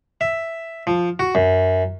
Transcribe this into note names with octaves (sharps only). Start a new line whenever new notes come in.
E5
F3
F#4
F#2